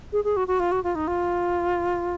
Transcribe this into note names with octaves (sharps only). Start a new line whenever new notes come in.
G#4
G#4
F#4
F#4
F4
F#4
F4
D#4
F4